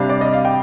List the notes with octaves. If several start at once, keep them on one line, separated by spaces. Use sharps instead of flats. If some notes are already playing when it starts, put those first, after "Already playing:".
Already playing: C3 G3 D4 F5
D5
D#5
F5
G5